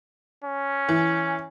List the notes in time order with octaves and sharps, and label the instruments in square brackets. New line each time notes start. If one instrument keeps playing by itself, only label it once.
[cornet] C#4
[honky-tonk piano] E3